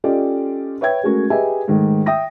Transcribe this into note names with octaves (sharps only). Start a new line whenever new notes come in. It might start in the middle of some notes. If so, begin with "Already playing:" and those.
C#4 F4 G4 A4 D5 D#5
B4 C#5 E5 G5 G#6
G#3 A3 C#4 F#4 A#4
G4 G#4 B4 D#5 E5 G#5
G#2 D#3 A3
E5 G5 D#6 A#6